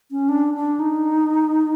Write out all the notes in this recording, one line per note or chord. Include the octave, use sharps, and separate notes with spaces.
C#4
D4
D4
D#4